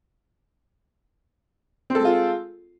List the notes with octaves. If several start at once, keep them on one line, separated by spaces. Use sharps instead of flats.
G#3 C4 F4 A4